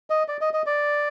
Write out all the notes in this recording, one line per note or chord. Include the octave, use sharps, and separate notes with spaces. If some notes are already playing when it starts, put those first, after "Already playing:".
D#5
D5
D#5
D#5
D5